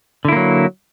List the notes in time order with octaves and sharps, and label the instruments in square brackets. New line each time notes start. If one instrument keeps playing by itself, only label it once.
[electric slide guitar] D3
E4
A#3
F#3